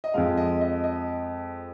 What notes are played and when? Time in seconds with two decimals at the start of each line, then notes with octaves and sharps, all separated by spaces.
0.04 D#5
0.14 F2 F3 G#3 F5
0.37 D#5
0.61 D#5
0.84 D#5